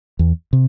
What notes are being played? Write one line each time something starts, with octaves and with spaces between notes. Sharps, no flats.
E2
C3